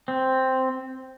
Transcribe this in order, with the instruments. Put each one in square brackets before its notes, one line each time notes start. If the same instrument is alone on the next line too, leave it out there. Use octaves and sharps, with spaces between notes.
[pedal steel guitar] C4